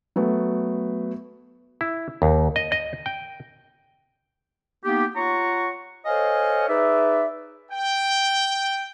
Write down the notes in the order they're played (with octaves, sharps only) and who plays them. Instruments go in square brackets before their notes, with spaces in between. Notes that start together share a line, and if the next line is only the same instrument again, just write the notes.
[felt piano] F#3 A3 B3
[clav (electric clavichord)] E4
D#2
D#5
D#5
G5
[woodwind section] A#3 B3 D#4 G4
F4 C#5 F#5 A#5 C#6
A4 C5 C#5 D#5 F5 G#5
D#4 G#4 B4 D5 E5
[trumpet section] G5